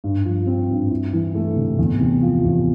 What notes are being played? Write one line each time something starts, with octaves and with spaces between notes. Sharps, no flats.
G2
F3
C4
G2
E4
E3
A3
C3
E2
C3
F3
E2